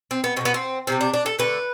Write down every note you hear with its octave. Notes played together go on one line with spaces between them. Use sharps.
C4
B3
B2 A3 C4
B3
C4
C3 E3 G3 C4
D4
D4
A4
D3 A3 B4